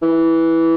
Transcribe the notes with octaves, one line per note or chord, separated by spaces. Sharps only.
E3